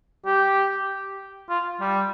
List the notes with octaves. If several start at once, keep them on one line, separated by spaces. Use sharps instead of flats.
G4
F4
G3